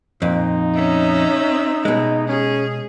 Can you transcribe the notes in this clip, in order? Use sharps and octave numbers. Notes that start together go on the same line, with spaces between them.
F2 A#2 D#4
C#4 E5
B2 G#3
C#4 G#4